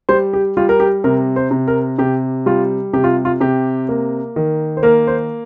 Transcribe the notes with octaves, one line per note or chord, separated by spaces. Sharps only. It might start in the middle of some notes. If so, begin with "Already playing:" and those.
G3 C5
G4
G3 F4
A#4
G4
C3 A#4
C5
C3
A#4
C3 G4
G3 F4
C3 G4
F4
F4
C3 G4
A#3
D#3
C5
A#3 A#4
C5